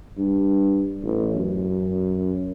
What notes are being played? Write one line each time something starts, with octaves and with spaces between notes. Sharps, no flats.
G2
A1
F#2